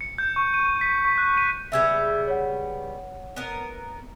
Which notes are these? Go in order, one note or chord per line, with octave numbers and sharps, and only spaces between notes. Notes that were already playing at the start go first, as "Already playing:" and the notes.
C#7
G6
C#6
D#7
B6
C#6
F#6
D#7
C#3 G3 B3 E5 E6 G#6
C#5 F#5
B3 A#4